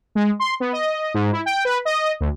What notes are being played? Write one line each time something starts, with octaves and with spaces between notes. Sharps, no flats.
G#3
C6
B3
D#5
G#2
E4
G5
B4
D#5
D2